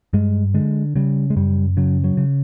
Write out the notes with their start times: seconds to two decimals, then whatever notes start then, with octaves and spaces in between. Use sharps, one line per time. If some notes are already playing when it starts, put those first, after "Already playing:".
0.13 G2 G#3
0.54 D3 G#3
0.96 C#3 G3
1.30 G#3
1.36 F#2 G3
1.77 C#3 F#3
2.04 F#3
2.17 C#3